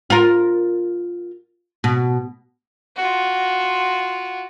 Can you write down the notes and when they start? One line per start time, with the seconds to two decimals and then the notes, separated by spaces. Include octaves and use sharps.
0.10 F4 A#4
1.84 B2
2.96 F4 F#4